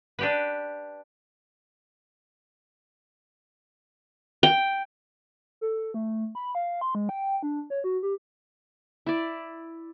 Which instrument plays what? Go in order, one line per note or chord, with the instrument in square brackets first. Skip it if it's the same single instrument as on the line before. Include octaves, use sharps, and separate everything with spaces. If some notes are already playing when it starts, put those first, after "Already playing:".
[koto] D4 G4 B4
[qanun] G5
[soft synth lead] A4
A3
B5
F5
C6
G#3
G5
D4
C#5
F#4
G4
[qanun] E4 D5